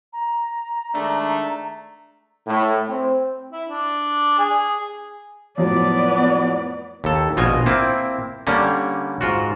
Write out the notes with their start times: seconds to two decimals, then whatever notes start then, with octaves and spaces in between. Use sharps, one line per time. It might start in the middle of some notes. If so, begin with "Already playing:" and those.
0.13 A#5
0.95 D#3 G#3 A3 D4
2.46 A2
2.88 C4
3.52 E4
3.68 D4
4.39 G#4
5.58 F2 A2 F#3 B3 D5
7.04 D#2 A4
7.37 A#1 B2 F4 D#5 G#5
7.66 A#3 C4 E4
8.47 D3 G3 A#3 C#4
9.21 G#2 F4 F#4